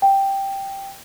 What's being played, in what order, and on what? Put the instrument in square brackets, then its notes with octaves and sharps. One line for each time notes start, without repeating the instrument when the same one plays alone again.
[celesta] G5